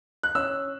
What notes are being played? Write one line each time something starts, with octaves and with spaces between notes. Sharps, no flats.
F#6
C#4 E6